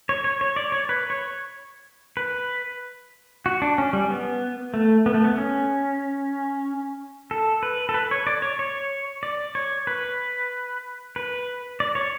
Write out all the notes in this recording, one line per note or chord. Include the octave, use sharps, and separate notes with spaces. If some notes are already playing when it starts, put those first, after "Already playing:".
C#5
C#5
C#5
D5
C#5
B4
C#5
B4
F#4
D4
C#4
G3
B3
A3
B3
A3
B3
C#4
A4
B4
A4
B4
C#5
D5
C#5
C#5
D5
C#5
B4
B4
D5
C#5